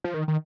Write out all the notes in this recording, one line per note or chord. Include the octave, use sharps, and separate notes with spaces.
F3
D#3
D#3